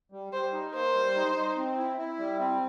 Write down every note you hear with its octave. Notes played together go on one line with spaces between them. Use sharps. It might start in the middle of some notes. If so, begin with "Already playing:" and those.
G3
G3 C5
D#4
A#3 C5
G3
D#4
D#4
C4
E4
E4
G3
C4